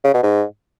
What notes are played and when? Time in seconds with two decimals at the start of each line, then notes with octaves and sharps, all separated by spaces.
0.04 C#3
0.14 B2
0.23 G#2